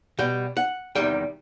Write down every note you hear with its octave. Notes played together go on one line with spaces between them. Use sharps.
B2 G3 G5
F#5
E2 C3 D#3 G3 G5